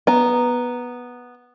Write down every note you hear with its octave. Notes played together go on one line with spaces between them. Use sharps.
B3 A#5